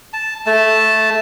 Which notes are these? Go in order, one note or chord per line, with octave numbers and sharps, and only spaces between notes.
A5
A3 A5